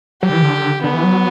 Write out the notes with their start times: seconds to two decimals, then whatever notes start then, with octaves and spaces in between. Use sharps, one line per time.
0.23 F#3 G4
0.29 D3
0.33 E3
0.42 D3
0.83 D3 B3
0.94 E3
1.04 F#3